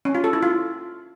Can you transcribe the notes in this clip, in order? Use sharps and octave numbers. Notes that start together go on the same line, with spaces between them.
C#4
F4
A4
E4
F4